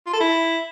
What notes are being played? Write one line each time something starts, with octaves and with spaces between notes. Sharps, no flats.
F4
A4
E4